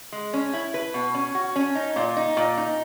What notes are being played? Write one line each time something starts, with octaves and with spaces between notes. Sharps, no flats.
G#3
C#4
E4
B4
B2
C#4
F#4
C#4
D#4
A#2
D#4
A#2
D#4